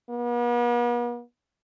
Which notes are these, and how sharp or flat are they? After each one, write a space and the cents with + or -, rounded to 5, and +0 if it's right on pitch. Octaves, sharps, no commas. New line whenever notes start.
B3 -45